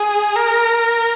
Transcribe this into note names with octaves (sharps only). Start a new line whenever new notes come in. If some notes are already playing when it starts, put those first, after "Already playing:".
Already playing: G#4
A#4